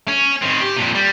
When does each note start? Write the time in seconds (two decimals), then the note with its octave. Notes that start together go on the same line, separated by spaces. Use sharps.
0.08 C#4
0.42 D#3 C4
0.61 G4
0.76 F2 A#2
0.95 G3